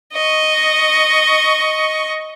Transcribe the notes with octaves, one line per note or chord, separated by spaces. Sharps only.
D#5 C#6